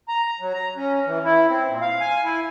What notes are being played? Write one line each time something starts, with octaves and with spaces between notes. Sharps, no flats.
A#5
F#3
A#5
C#4
E3
E4
C4
A#2
F5
G#5
E4